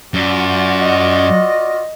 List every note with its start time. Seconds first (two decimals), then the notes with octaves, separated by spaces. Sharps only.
0.14 F#2 F4 F#4 D5
0.80 D#5